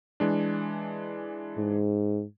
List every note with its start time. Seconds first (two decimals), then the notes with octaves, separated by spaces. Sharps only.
0.20 E3 G#3 D4
1.58 G#2